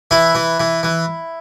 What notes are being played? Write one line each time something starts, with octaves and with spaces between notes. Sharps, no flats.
E3 E4
E3
E3
E3